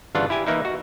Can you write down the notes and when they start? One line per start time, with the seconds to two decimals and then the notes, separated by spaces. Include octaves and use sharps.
0.15 G1 C#3 E3 D4 F4 F#5
0.30 E4 G4 G#5
0.47 E3 A#3 D#4 E4
0.65 F#4